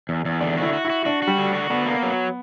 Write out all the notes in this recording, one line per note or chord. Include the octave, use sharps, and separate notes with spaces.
E2
E2
D3 D5
E4 F#4
F#4
E4
F#4
D4 F#4
F#4
G3
D3
F#4
D3 B3
A#3
F#3